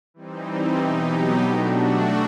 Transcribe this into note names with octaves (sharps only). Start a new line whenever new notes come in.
E3 G3 C4 D#4
B2 F#3 B3 D#4 G4
A3 D4 F#4